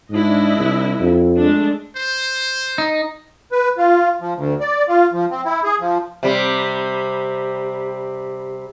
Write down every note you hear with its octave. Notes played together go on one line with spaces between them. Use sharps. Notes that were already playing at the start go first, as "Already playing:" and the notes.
G#2 D4 E4 D#5
C2
F2
G#3 A3 D4
C5
D#4
B4
F4
F3
D2
D5
F4
F3
C4
E4
G#4
F3
C3 G3